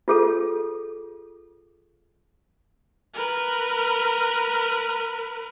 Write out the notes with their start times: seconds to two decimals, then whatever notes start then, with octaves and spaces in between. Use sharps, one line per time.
0.08 F4 G#4 A4
3.14 A#4 B4